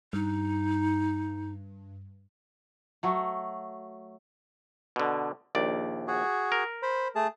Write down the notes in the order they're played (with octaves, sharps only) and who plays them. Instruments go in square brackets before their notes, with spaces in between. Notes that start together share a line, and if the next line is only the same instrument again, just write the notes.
[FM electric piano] G2 [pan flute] D#4
[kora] F#3 A3
[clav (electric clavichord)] B2 D3
A#1 D#2 D5
[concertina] F#4 G#4
[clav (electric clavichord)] A#4
[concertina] C5 B5
A3 G#4 A5